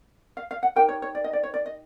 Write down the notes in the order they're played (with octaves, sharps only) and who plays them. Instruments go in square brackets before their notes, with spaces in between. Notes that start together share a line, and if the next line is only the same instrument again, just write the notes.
[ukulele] F5
F5
F#5
D#4 G4 A#4 G5
C#5
C#5
D5
D#5
D5
C#5
D5
D#5